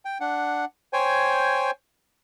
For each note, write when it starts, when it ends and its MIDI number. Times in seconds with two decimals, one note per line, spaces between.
0.05 0.18 79
0.20 0.65 62
0.20 0.65 78
0.93 1.71 72
0.93 1.71 73
0.93 1.71 79
0.93 1.71 80